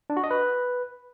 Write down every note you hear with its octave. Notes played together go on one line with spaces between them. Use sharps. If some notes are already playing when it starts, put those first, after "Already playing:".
D4
F#4
D#5
B4